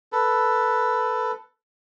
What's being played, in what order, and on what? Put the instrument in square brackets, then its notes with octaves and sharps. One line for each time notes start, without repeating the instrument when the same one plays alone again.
[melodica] A4 B4